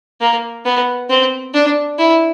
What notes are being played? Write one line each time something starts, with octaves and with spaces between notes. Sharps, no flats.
A#3
B3
C4
D4
E4